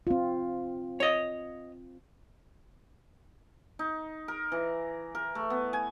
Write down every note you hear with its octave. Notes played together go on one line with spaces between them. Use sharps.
C4 F4
C#5 D#5
D#4
A#4
E3
A#4
A3
B3
G#5